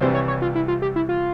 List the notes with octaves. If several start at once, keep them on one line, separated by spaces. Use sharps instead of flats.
C2 C3 E3 G3 C5
C#5
C#5
F4
E4
F4
G4
E4
F4